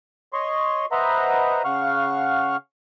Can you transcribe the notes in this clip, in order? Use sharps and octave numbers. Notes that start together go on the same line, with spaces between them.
C#5 D#5 C6 C#6
B4 C5 D#5 E5 F#5 A#5
C#3 F5 F#5 C#6 F6